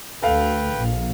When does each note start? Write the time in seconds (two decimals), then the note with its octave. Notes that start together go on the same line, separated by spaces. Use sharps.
0.22 D2 A4 B4 F5 G5
0.75 A#1